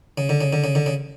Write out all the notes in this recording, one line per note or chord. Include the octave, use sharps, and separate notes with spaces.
C#3
D3
C#3
D3
C#3
D3
C#3